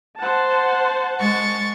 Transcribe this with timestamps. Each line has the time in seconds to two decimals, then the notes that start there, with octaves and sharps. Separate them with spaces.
0.19 C5 F#5 A5
1.18 G#3 C#6 A6